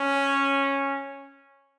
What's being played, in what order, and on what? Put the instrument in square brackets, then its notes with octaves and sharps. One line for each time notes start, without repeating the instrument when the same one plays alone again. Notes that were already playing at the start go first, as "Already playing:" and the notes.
Already playing: [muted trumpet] C#4